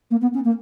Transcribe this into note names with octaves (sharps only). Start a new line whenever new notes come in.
A#3
B3
C#4
A#3